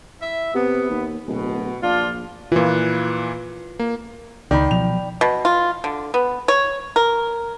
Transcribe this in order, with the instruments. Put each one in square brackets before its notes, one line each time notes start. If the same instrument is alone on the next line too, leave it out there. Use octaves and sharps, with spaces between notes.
[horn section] E4 E5
[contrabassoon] C3 [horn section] B3
[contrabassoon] D#2
[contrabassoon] D1 [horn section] B2
[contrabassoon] A#1 [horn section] D4 F4
[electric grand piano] A#2 E3 [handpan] F4 B4
[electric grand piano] A#3
[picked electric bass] C#2 [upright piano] D#3 [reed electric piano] D5 G5 B5
[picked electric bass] B2 F3 F#3 [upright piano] F7
[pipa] B2
F4
D3
B3
C#5
A#4